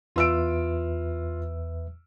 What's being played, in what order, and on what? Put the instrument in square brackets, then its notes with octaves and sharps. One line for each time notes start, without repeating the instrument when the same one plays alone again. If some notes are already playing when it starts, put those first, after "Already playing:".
[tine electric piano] E2 B4 E5 [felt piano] F4 E6 D7